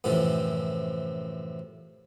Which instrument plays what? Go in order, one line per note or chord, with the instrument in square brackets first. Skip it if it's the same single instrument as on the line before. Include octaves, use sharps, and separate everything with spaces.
[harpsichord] F#2 A2 C3 E3 F3